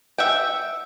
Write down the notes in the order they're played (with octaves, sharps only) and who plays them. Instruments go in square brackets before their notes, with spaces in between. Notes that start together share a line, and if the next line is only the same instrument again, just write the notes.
[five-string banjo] E5 F#5 G5